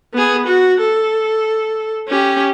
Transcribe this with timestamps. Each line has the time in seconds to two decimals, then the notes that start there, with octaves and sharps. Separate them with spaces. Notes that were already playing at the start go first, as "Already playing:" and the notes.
0.14 B3 G#4
0.47 F#4
0.80 A4
2.08 C#4 G4